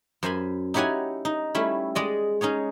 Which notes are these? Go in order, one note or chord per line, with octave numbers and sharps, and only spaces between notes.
F#2 C5 G#5 B5
D#4 E4 G4 C#5 F#5 G#5
D#4
G3 A3 C#4 E4
G#3 D5 D#5
C#4 D#4 G#4 C#5